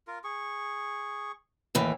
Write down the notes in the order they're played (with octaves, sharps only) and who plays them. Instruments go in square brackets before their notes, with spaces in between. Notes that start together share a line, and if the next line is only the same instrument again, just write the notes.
[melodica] F4 A#4
G#4 C#6
[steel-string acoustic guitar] D#2 A2 E3